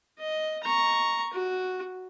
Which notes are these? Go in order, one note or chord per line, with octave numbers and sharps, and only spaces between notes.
D#5
A#5 C#6
F#4